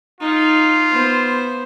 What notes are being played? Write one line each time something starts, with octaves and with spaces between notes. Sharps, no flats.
D#4 F4
B3 C5